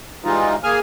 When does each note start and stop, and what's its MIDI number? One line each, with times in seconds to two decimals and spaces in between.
0.25 0.56 52
0.25 0.56 55
0.25 0.56 56
0.25 0.56 63
0.25 0.56 65
0.64 0.79 58
0.64 0.79 68
0.64 0.79 80
0.64 0.79 89